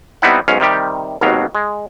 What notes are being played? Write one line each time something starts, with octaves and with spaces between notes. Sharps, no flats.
G3 B3 C4 D#4 E4 F#5
B1 G#2 C#4 F5
C3 D#3 G3 G4
G#1 D#2 B2 F#3 F5
G#3